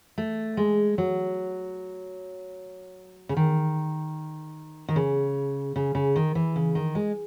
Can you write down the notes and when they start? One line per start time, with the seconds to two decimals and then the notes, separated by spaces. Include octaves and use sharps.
0.18 A3
0.57 G#3
0.98 F#3
3.29 C#3
3.37 D#3
4.89 D#3
4.96 C#3
5.76 C#3
5.95 C#3
6.16 D#3
6.35 E3
6.56 C#3
6.75 D#3
6.95 G#3